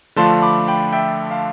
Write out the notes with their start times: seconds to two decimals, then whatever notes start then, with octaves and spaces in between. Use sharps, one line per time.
0.16 D3 F3 A3 D4 F4 A5 C6
0.42 B5 D6
0.68 G5 B5
0.92 E5 G5
1.31 F5 A5